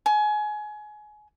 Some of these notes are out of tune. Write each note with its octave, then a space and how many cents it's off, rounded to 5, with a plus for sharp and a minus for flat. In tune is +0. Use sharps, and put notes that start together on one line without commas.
G#5 +25